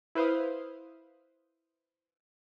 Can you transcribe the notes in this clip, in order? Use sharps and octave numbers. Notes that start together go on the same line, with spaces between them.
E4 B4 C5 F5 D#6